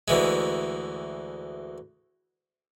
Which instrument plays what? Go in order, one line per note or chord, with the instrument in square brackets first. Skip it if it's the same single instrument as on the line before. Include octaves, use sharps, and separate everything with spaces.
[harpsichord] D2 E3 G#3